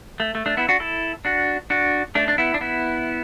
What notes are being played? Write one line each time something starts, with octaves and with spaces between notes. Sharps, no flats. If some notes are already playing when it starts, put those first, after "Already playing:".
A3
A3
A3 D4
B3 E4
D4 F#4
E4 A4
D4 F#4
D4 F#4
A3 D4
D4
B3 E4
D4
B3 E4